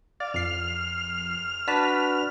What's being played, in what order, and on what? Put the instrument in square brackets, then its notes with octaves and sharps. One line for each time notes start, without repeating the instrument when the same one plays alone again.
[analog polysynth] D5 [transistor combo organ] F5
[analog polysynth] F2 C7 [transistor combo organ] F6
[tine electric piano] D4 F#4 B4 [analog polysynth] A5 B6